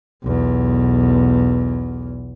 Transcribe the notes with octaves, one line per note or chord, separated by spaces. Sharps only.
B1 E2